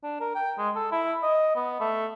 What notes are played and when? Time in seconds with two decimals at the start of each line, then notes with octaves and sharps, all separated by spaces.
0.03 D4
0.21 A#4
0.35 G5
0.58 G#3
0.76 A4
0.92 E4
1.23 D#5
1.56 B3
1.80 A3